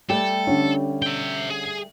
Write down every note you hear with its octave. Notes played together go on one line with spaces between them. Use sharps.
G3 A3 G4 A4
D3 C#4
E5 G5
G#4